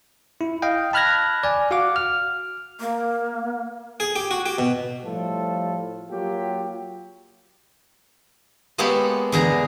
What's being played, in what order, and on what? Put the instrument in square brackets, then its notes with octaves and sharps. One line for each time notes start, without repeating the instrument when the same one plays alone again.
[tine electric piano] E4
D#5 F5 G5
A5 B5 F6 F#6 G#6 A#6
D5 G#5
F#4 F5 F#5 D6
F6
[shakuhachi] A#3
[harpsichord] G#4
G4
F#4
G4
B2
[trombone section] A2 F3 G3 F4 A4
F#3 A#3 F4 G4
[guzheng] G#3 A#3 B3 G4 A4 C#5
E2 D3 G#4 A#5